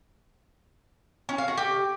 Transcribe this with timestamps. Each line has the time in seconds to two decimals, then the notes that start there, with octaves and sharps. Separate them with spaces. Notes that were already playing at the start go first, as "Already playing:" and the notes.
1.29 C#4
1.38 F5
1.48 F#4
1.57 G4